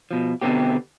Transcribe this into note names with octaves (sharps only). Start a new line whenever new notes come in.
B2 F3
B2 D3 B3 C4 G4